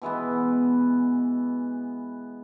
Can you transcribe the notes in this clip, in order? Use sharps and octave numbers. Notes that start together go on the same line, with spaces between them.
B2 E3 G#3 B3